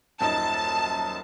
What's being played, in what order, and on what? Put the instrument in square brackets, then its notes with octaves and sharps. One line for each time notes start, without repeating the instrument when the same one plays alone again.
[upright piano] D#1 F#2 D#4 [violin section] A5